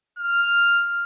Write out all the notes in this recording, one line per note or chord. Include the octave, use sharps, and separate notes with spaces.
F6